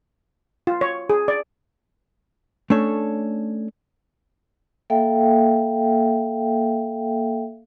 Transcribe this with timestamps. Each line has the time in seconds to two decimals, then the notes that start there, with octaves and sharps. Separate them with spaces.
0.67 F4
0.81 C#5
1.10 G#4
1.28 D5
2.70 A3 C#4 D4 A4 C#5
4.90 A#3 A4 E5 F5 G5